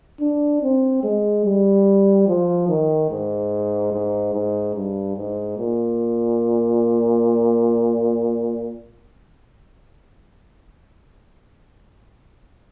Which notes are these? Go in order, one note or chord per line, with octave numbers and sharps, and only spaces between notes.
D4
C4
G#3
G3
F3
D#3
G#2
G#2
G#2
G2
G#2
A#2